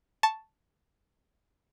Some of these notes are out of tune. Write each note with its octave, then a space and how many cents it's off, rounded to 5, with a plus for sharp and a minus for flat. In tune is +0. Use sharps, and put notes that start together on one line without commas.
A5 +0 C#6 -5